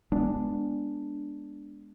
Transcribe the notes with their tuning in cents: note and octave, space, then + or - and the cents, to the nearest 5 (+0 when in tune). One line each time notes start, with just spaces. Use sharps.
G#3 +0 B3 +0 D4 +0